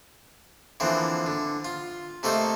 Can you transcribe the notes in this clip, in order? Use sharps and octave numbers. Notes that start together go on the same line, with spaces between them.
D3 E3 F3 A#3 C4
D3
F4
C3 A3 A#3 D#4 A4 C5